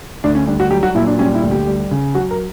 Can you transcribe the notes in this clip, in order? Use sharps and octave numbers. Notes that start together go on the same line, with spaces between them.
D2 D4
C#4
G3 D4
F#4
F#3 G4
F#4
A#2 E4
D4
G3 C#4
E4
D2
G4
G3
C#3
F#3 F#4
A#4